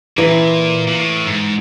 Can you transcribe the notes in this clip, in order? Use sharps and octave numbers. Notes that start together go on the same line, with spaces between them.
A#2 E3
A#2
A2
G#2